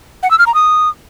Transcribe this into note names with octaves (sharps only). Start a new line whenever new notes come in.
F#5
E6
F6
A#5
D#6